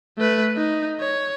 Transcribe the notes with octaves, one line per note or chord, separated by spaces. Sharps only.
A3 B4
D#4
C#5